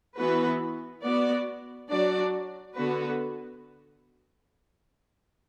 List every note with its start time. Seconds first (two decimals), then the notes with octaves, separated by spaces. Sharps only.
0.17 E3 B3 F#4 B4
1.03 B3 F#4 D5
1.89 F#3 D4 F#4 D5
2.75 D3 B3 F#4 B4